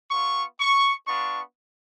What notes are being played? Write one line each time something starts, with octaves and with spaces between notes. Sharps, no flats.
B3 F4 C#6
C#6
B3 D4 F4 C#6